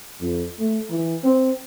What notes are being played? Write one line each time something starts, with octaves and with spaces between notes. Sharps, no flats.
F2
A3
E3
C4